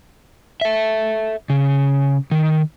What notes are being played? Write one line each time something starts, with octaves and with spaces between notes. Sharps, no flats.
A4 E5
C#3
D#3